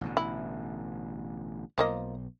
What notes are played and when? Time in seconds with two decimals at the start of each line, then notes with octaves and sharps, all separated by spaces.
0.01 A1 B2 D3
0.17 E4
1.78 B1 F3 A#3 D#5